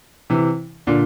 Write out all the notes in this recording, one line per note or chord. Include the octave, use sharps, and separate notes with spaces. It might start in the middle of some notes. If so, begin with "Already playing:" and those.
C3 E3
A#2 D3